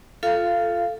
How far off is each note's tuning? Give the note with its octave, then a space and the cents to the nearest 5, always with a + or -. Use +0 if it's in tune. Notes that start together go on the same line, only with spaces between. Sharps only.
F4 +0 A4 +0 F5 -20